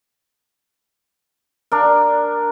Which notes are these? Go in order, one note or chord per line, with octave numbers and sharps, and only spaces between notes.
D4 A#4